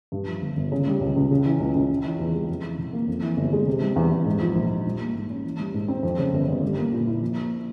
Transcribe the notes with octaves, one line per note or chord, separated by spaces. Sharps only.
G2
F3
G1
G1
C#3
G3
C#2
C#2
C#3
E3
C#2
C#2
C#3
E3
E2
G#3
F2
E3
F1
A#3
F2
E3
G1
G#3
C3
G3
E2
E2
G#2
F3
A#1
A#1
G3
A#3
G#2
C#4
E3
G3
G#2
C4
F2
C#3
G1
G1
G3
A#3
A#2
E4
F3
A#3